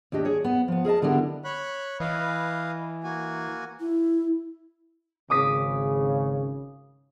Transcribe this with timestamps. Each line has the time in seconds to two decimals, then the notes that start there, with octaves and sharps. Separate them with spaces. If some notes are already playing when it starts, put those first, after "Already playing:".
0.12 D#2 D4 G4 D#5
0.25 G#4 C#5
0.44 B3
0.68 F3 B3
0.85 G#4 A#4 D#5 A5
1.02 D3 B3 D4 E4 G4 A#4
1.44 C#5 B5 F#6
2.00 E3 B4 D#5 F5
3.04 A#3 F#4 G#5
3.80 E4
5.30 G#1 C#3 D6 D#6 B6